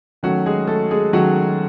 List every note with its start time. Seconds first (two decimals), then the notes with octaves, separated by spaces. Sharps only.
0.23 D#3 F#3 A3 C#4 F#4
0.46 G#3 G#4
0.67 A3 A4
0.91 G#3 G#4
1.13 D#3 F#3 A3 C#4 F#4